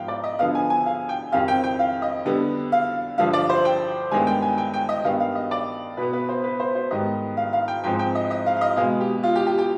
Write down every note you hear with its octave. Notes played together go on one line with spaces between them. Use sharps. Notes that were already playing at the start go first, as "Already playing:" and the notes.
Already playing: G#2 F3 B3 F5 G5
D5
D#5
D3 F3 B3 F5
G#5
G#5
F5
G5
F2 D#3 G3 C4 F5
G5
G5
F5
D#5
D3 G3 B3
F5
G2 D3 F3 F5
D5
C5
G5
G2 D#3 G#3 B3 G#5
G5
G#5
G5
G5
D#5
G2 D#3 B3 F5
F5
D#5
D5
B2 B3 B4
B4
C5
B4
C5
C5
G#2 D#3 G3 B3 D#5
F5
F5
G5
G#2 F3 G#3 C4 G5
G5
D#5
D#5
F5
F5
D#5
B2 G#3 B3 F5
G4
F4
G4
G4
G4